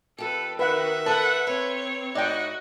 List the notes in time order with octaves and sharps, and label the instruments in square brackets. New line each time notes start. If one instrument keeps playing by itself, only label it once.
[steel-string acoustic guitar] F2 G4 [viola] A4 B4
[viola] D#3 F#4 [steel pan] B4 F#5 [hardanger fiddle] E5
[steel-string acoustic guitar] A4 B4 [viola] F#5 [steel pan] A5
[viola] C4 C#5 [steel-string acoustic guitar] B4
[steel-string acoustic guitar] A2 D#4 [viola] F#4 [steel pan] D5 G5 [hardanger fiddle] D#5